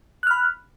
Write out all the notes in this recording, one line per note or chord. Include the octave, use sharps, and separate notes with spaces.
B5 F6 F#6